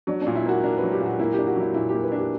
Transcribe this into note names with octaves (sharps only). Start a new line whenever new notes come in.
F#3 D4
D4
A#2
E4
A#3 F#4
D4 A#4
F#3 B4
G4
A#2
F#4
A#3 E4
D4 G4
F#4
F#3 E4
A#2 E4
A#3 G4
B4
D4 G4